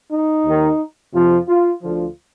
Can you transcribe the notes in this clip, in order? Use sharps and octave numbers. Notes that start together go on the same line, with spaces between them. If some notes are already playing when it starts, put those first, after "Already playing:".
D#4
D#2 D#3
F2 C3 F3 F4
F4
D2 D3 F3 F4